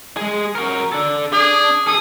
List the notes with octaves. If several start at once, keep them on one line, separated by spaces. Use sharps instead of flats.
G#3 G#4
F#4 A#4
D4 A4
D4 G#4
G#4 A4 D#6